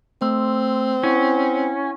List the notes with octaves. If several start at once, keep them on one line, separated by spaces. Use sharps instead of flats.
A3 C4 C6 E6
C#4 E4 F#5